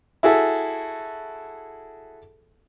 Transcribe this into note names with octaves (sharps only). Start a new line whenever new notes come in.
E4 F#4 G#4 A4 E5